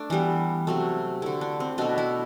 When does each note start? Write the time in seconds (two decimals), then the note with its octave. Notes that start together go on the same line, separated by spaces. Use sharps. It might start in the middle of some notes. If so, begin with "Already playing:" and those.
Already playing: A3 D4
0.10 E3 G3 B3
0.67 C3 F#3 A3
1.22 D3 A3 E4
1.41 D4
1.60 C4
1.78 B2 A3 D4
1.98 E4